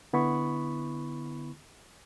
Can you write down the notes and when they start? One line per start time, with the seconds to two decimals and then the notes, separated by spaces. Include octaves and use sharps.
0.13 D3 B3 E4 B5 C#6